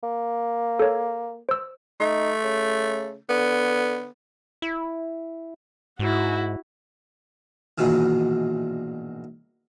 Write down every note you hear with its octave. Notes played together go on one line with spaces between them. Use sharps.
A#3
A4 C#5
C5 E6
A3 D#4
C#3
D3 B3
E4
G#2 E4 F#4
A#1 G#2 B2 D#3 E3